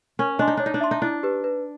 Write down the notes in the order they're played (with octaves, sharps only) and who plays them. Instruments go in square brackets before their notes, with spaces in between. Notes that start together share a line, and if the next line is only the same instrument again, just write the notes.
[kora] C#4 [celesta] A#4
[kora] D4 [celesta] D#5 G#5 C6
[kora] D#4
[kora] D4 [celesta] C#5
[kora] D#4
D4
[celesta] E5 A5 C6
[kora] D#4
[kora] D4 [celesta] E4
[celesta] G4 B4
B4